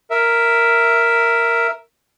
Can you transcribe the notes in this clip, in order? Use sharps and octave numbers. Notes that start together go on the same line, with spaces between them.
A#4 E5